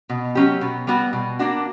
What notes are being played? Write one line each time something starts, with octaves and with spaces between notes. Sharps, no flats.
B2
F#3 C#4 G4
B2
G3 B3 F#4
B2
A#3 D4 F#4